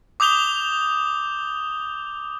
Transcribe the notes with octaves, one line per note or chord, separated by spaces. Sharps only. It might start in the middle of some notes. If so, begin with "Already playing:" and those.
D6 D#6 G6 F7 G7